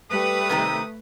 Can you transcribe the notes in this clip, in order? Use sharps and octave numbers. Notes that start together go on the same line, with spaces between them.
G3 A3 B4 D#6
C3 D#3 C4